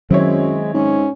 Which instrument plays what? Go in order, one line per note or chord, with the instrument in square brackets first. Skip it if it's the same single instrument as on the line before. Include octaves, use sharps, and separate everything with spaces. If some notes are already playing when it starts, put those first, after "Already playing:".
[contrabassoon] F#2 [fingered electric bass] D#3 F#3 [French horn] G#3 [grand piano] C4 E4 C#5
[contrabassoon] G#2 [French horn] C#4